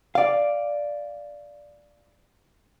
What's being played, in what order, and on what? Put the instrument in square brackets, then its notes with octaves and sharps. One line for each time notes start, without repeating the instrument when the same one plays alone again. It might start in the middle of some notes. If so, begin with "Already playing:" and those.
[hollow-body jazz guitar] D5 F5